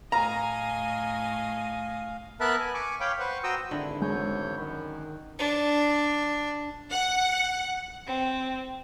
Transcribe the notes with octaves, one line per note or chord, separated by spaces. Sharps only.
A2 D#5 F5 G#5 A#5
B3 A#4 E5 A5 B5 F#6
G#5
G#5 C#6 D6
C#5 F5 G5 B5 D6
B4 C5 F#5 C#6
F#4 C5 G5 A#5 D#6 E6
G#1 D3 E4
E2 G#3 C#5 G6
F#2 D#3 B5
D4
F#5
C4